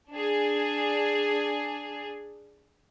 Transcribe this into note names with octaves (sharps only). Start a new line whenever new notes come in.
D4 G#4